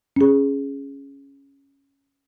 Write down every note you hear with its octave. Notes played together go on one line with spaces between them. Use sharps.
C#4 G#4